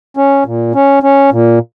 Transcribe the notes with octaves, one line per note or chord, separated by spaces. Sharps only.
C#4
A#2
C#4
C#4
A#2